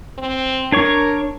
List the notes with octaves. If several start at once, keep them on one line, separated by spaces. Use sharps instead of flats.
C4
D4 A#4 C#5 C#6